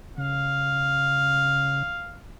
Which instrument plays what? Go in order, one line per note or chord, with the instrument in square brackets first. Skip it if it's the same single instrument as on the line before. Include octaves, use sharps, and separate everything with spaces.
[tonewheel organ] C#3 [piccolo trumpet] F5